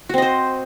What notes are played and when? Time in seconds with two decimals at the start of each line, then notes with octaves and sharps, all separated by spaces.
0.09 F#4
0.14 C4
0.18 D#5
0.22 C5